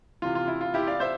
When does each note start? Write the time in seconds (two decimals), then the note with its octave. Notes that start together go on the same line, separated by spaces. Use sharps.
0.22 C3 E3 F4
0.35 F4
0.48 E4
0.61 F4
0.74 E4 G4
0.87 D5 F5
1.00 C5 E5